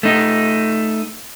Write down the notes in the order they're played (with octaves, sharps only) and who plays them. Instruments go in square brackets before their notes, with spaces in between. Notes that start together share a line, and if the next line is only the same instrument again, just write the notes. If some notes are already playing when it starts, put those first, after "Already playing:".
[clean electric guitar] A3 D#4